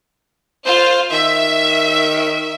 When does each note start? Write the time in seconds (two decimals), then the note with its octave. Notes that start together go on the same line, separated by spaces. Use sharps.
0.66 F4 C5
1.12 D#3 E5